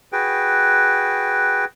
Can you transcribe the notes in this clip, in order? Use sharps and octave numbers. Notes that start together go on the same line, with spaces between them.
F#4 G#4 B4 G5